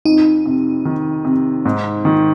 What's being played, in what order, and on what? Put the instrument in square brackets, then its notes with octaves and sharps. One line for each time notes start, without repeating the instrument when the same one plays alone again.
[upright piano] F2 [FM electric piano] D#4
[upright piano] C3
D#3
C3
G#2
D#3